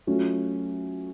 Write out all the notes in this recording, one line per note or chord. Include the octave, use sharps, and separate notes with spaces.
F#3 A3 C#4 F4